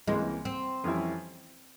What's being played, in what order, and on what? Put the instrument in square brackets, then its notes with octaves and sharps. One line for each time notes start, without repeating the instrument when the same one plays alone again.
[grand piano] C#2 C3 E3 A#3 [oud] G#3
[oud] C4
[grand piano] F2 E3 G3 C#4 E4